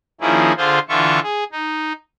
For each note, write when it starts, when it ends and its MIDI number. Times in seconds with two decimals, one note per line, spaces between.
0.21 0.52 51
0.21 0.52 53
0.21 0.52 58
0.21 0.52 61
0.21 0.52 64
0.21 0.52 68
0.57 0.79 50
0.57 0.79 65
0.57 0.79 68
0.57 0.79 72
0.89 1.20 50
0.89 1.20 52
0.89 1.20 65
0.89 1.20 76
0.89 1.20 85
1.23 1.44 68
1.52 1.93 63